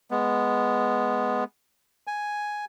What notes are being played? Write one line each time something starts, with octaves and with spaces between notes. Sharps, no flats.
G#3 B3
G#5